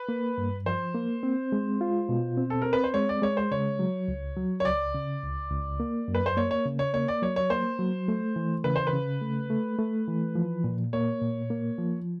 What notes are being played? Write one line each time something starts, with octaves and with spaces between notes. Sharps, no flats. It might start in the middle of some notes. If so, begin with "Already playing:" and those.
Already playing: B4
A#3
G2
F3 C5
A#3
C4
G#3
F4
B2
C4
A4
C4 A#4
B4
C5
G#3 C#5
D5
G#3 C#5
C5
C#3 C#5
F#3
C#2
F#3
C#5
C#2 D5
C#3
C#2
C#2
A#3
F#2
B4
C5
A#3 C#5
C#5
C#3
C#5
A#3 C#5
D5
F#3 C#5
C#5
A#3 C5
F#3
A3
E3
C#3 B4
C5
B4
C#3
A3
A3
A3
E3
F3
A#2
A#3 C#5
A#2
A#3
F3